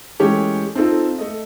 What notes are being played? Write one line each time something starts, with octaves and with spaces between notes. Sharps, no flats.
E3 G#3 A3 C#4 G4 C#5
C4 D#4 F4 A4
A3 D#5